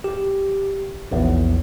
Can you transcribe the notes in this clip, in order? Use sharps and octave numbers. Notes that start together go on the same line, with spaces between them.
G4
A#1 E2